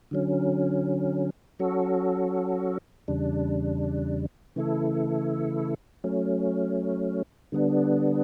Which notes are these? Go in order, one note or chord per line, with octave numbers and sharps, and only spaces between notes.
D3 F#3 C#4
F#3 C#4 F#4 A4
E2 C#3 G3 D4
C#3 E3 A3 E4 A4
F#3 A3 C#4
D3 G3 B3 D4